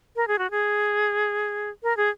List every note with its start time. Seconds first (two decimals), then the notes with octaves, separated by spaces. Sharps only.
0.16 A#4
0.28 G#4
0.39 F#4
0.51 G#4
1.83 A#4
1.97 G#4